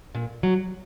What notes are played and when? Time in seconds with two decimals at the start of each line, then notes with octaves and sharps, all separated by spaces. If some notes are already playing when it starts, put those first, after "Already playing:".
0.15 A#2
0.43 F#3